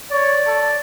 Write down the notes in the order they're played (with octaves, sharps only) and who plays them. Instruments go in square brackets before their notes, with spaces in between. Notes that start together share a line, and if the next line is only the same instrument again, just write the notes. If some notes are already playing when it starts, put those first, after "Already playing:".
[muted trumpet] C#5 [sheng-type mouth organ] D5
[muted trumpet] A4